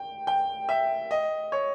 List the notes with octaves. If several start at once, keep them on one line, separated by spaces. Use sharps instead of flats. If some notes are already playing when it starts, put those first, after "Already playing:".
Already playing: G5
G5
E5
D#5
C#5